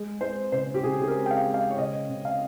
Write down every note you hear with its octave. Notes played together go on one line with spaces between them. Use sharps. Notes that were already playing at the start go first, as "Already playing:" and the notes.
Already playing: G#3
G#3 C5
C#3 C5
G4
C#3 G#4
G#4
A#4
G#3
G5
F5
G#3
F5
C#5
C#3 D#5
C#3
F5